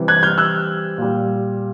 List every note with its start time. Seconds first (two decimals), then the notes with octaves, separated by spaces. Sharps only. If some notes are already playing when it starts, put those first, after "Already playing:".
Already playing: C3 E3 G3
0.08 F#6 G#6
0.23 F6 G6
0.38 E6 F#6
0.98 A#2 G3